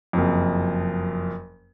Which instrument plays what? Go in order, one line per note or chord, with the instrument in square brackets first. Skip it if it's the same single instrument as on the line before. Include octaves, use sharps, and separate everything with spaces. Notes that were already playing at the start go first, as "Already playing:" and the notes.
[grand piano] F#1 F2